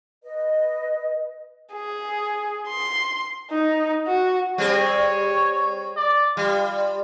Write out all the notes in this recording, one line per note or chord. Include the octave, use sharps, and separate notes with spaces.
B4 D#5
G#4
C6
D#4
F#4
G3 C4 G#4 C#5
D5
G3 F4